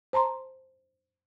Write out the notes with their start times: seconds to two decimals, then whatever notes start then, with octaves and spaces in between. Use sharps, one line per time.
0.13 C5 A5 A#5 C6